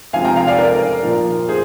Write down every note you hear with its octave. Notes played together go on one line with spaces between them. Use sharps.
C3 F3 G#3 F5 G#5
G5 A#5
F5 G#5
D5 F5
A#4 D5
A#2 F3 A#3
G#4 C5